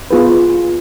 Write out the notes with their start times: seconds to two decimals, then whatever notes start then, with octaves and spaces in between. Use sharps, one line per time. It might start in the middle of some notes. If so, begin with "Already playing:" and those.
0.11 B3 F4 G#4 B4